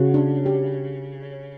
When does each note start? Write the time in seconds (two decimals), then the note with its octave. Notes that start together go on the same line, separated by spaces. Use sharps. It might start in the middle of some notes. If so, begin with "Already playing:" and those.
Already playing: C#3 F#4
0.14 D4
0.46 G4